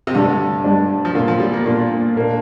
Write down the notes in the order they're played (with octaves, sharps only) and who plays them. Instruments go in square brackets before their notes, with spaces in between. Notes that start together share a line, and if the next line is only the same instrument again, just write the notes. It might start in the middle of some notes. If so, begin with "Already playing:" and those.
[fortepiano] C3
[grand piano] G2 G3 D4 [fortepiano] D3
[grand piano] G2 G3 D4
[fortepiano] F3
[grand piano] A#2 A#3 F4 [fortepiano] D3
[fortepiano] F3
G3
A#3
[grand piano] A#2 A#3 F4 [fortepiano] D4
[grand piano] A#2 A#3 D4